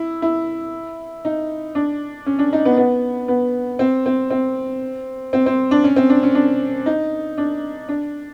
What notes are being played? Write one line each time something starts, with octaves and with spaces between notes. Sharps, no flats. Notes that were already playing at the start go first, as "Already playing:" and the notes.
Already playing: E4
E4
D#4
D4
C#4
D4
D#4
B3
B3
B3
C4
C4
C4
C4
C4
D4
C#4
C4
D4
C#4
D4
D#4
D4
D4